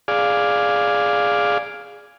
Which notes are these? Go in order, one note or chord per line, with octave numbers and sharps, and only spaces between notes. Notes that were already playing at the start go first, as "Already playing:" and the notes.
G#4 D5 F5